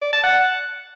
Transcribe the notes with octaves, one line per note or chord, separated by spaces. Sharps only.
D5
A5
F#5